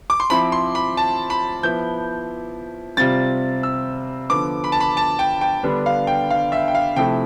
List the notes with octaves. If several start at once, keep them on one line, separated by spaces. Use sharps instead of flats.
D6
C6
F3 C4 E4 B5
C6
B5
A5
B5
F3 B3 E4 G6
C3 G3 C4 F4 A6
E6
D3 F3 B3 D6
B5
A5
B5
A5
G5
G5
D3 G3 B3 D4
F5
G5
F5
E5
G5
F5
C3 F3 A3 E4 G5